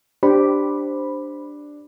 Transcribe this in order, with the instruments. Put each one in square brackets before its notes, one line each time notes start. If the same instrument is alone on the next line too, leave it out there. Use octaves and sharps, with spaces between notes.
[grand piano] D4 [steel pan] G4 [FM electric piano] C5 B5